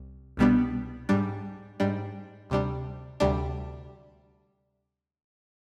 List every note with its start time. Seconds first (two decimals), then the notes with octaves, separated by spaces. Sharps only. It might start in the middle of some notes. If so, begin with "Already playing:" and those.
Already playing: C2
0.37 C2 B2 G3 B3 D4
1.09 G#2 G3 D4
1.80 G#2 G3 D4
2.50 D2 C3 G3 D4
3.20 D2 C3 G3 D4